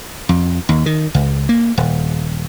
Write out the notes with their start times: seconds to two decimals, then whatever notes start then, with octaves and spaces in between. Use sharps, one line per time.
0.29 F2
0.69 D#2
0.86 D#3
1.15 C#2
1.49 A#3
1.78 D#1